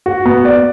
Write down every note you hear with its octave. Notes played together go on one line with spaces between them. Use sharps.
F#4
B3
D5